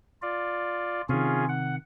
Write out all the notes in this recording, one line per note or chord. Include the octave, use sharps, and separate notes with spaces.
F4 D5
C3 D#3 C#4 F4 G#4
F#5